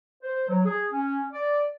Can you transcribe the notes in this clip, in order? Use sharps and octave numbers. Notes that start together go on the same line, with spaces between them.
C5
F#3
G#4
C#4
D5